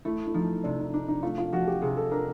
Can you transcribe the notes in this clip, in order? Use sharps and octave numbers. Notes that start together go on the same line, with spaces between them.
A3 E4
E4
F3 D#4
C3 D4
D#4
D4 D#4
D#4
A3 F4
F4
F3 F#4
G4
C3 G#4
A4
D4 A#4